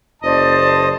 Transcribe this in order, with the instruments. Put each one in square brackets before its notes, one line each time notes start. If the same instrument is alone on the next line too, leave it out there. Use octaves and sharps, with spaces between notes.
[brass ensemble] F#1 A5 [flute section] C5 D5 [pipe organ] D#5